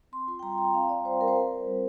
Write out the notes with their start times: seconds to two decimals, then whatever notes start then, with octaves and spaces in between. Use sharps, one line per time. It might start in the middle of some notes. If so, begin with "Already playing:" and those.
0.12 C4 C6
0.27 F4 C6
0.39 G5
0.43 G3 A#5
0.58 G3 G5
0.74 C4 F5
0.89 F4 D5
1.05 G3 C5
1.20 G3 A#4
1.28 C5
1.36 C4 A#4
1.52 F4
1.67 G3